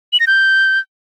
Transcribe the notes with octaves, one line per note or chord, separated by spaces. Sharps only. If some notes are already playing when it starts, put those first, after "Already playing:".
F#7
A#6
G6